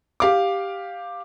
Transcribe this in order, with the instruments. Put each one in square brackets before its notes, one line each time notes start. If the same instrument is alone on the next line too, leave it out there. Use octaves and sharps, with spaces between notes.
[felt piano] G4 F5 D6